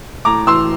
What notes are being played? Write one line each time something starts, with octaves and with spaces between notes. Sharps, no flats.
A2 A#5 D6
E3 C6 E6